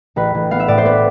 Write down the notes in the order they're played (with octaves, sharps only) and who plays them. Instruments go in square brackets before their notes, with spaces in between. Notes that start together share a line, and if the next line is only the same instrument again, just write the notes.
[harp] A1 B4
A1
B3 F5
E5
A2 D5
C5
B3 B4